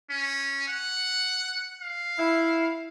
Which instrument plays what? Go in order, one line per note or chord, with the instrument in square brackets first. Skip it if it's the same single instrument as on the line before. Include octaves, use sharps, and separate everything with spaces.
[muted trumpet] C#4
F#5
F5
[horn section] E4